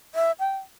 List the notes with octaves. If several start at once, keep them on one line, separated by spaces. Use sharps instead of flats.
E5
G5